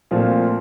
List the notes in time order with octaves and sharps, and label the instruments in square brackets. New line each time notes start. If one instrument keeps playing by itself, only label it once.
[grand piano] A#2 F3 A3 C4 F4